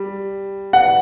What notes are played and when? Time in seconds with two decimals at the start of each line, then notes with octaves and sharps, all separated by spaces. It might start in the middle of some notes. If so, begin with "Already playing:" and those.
Already playing: G3
0.73 F#5